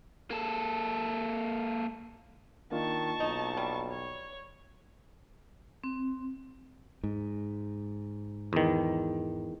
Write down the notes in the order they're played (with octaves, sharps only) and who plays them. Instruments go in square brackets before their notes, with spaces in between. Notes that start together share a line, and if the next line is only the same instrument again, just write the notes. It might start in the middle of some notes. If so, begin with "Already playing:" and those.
[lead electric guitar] A#3 A4
[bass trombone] D#3 [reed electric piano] A#3 D4 F4 [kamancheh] A5 C#6
[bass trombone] B1 [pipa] D#4
[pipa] G3
[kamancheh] C#5
[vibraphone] C4
[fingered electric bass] G#2
[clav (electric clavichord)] E2 D#3